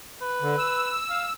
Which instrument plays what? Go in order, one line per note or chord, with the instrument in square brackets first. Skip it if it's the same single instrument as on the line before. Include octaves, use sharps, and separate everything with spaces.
[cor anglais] B4
[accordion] D3
E6
[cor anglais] F5